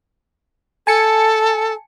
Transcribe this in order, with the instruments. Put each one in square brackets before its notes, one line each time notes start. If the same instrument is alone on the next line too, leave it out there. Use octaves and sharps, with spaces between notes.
[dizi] A4 [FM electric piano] G#5 A5 C#7